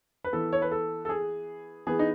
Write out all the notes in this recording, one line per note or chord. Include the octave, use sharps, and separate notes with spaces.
B4
E3 B3 A4
C#5
B4
A4
A4
G#4
E3 B3 G#4
D#4